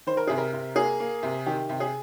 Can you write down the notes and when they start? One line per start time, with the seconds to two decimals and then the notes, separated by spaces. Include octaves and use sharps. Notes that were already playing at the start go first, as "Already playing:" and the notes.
0.07 D#3 C5
0.17 A#4
0.27 C3 G#4
0.38 A#4
0.53 C3
0.76 A#3 G#4
1.00 A#3
1.23 C3
1.46 D#3 G4
1.69 C3
1.80 G#4